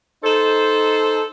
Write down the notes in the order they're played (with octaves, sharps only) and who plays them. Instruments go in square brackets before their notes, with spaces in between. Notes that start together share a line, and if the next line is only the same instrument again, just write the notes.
[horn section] D#4 A4 C5